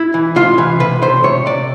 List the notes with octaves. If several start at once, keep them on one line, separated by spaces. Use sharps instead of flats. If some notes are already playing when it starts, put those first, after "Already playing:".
Already playing: E4
E3
C3 F4
E3
C3 B4
C3 C5
C3 C#5
C3 D5